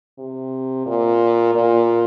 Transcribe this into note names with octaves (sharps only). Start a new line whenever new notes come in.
C3
A#2
A#2